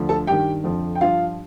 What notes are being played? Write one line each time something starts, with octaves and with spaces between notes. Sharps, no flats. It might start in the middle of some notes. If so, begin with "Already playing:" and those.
Already playing: D2 D3 F3
A4 A5
G2 D#3 G4 G5
F2 D3 F3
G5
G2 F3 F4 F5